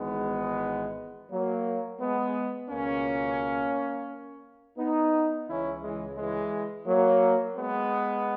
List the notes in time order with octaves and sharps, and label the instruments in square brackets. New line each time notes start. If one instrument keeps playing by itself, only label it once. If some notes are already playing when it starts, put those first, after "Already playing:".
Already playing: [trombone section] G#1 G#2 E3 G#3 B3
F#3 A#3
G#3 B3
C#2 B2 A#3 C#4
B3 D#4
C#2 C#3 E3 C#4 E4
E3 G#3
E3 G#3
F#3 A#3
G#3 B3